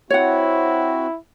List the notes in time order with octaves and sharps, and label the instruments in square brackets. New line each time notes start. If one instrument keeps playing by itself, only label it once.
[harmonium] C4 F#4 [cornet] E4 [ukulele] C#5 F#5